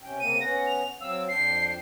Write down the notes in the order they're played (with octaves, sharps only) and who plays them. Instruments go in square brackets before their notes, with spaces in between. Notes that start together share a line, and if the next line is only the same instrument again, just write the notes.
[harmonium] C3 C#4 G5
[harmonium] C#3 A#3 C4 [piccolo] D#7
[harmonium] B3 C#4 F#5 [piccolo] A#6
[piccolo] F7
[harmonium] F#3 C4 F5 [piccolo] E6
[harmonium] F2 D4 G5 [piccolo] C7